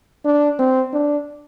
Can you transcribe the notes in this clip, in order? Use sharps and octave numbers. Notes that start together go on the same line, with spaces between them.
D4
C4
D4